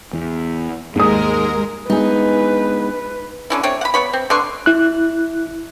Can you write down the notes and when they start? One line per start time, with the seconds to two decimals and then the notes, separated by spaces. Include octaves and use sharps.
0.13 E2
0.96 D#2 G#2 G#3 A#4 D#6
1.90 G#3 B3 D4 D#4 G#4 B4
3.50 D3 C#4 E4
3.63 A3 C4 D4 C#5
3.81 F#5 B5
3.94 B3 D#4 C#5 B5
4.13 C4
4.30 D3 B4 C6 C#6
4.66 E4 F#6